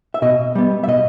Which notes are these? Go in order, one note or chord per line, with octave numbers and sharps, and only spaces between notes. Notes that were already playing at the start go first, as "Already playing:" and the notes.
E5
B2 D#5
G3 B3
E5
B2 D#5